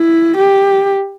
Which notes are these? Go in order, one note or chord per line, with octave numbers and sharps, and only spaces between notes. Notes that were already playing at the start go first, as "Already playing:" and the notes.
Already playing: E4
G4